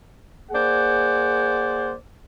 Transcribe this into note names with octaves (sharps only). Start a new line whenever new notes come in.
A#3 G#4 C5 D5 F#5